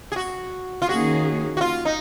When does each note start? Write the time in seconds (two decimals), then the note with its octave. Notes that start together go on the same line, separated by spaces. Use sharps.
0.12 G#4
0.16 F#4
0.82 F4
0.88 D#3 A#3 C#4 F#4 G#4
1.57 F#4
1.61 F4
1.85 D#4